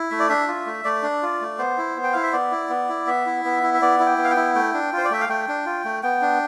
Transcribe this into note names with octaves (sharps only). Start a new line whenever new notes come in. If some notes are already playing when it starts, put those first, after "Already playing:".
Already playing: E4
A3 E5
D5
D4 E5
F4
A3
A3 D5
D4
F4
A3
B3 C5
E4
B3
G5
E4 F5
E5
B3 D5
E4
B3
E4
B3 E5
E4
B3
E4
E5
B3 D5
E4
G5
B3
F5
G5
E4
A3 G5
D4
F4 C5
D5
A3 E5
F5
A3 G5
D4
F4
A3
B3 G5
D4